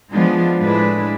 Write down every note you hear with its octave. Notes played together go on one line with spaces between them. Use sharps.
F3 G#3 B3 D4 F4
A2 G#3 D4 E4 B4